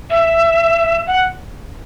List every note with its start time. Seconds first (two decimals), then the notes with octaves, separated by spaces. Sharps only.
0.10 E5
1.07 F#5